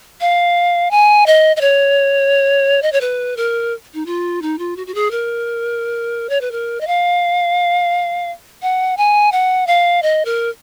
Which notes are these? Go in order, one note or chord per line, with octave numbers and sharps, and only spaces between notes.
F5
G#5
D#5
D#5
C#5
D#5
C#5
B4
A#4
D#4
F4
D#4
F4
F#4
F#4
G#4
A#4
C#5
B4
A#4
D#5
F5
F#5
G#5
F#5
F5
D#5
A#4